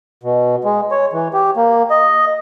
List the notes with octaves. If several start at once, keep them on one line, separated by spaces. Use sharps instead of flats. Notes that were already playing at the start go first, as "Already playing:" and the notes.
B2
G#3
C#5
E3
G4
A#3
D#5